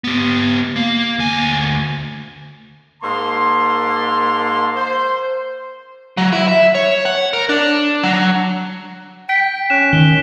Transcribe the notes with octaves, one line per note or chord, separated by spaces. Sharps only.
B3 G4
A#3
D2 G#5
G#2 A#3 A5 C6
C5
F#3
E4
E5
C#5
F#5
A#4
D4
F#3
G5 B6 D7
C#4 F#6 E7
D#3 G7